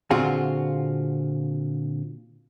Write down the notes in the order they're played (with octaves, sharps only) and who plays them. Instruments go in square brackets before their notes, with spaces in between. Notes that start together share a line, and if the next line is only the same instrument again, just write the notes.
[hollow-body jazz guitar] A#2 D3 C4 F4 F#4 G#4